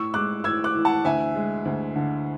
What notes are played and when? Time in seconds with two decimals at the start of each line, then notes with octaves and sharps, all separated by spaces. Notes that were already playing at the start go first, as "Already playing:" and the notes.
Already playing: A2 C#6 E6
0.14 G#3 D6 F#6
0.44 A2 E6 G#6
0.64 D6 F#6
0.75 E3
0.85 F#5 A5
1.05 D2 E5 G#5
1.35 G#3
1.65 D2
1.96 D3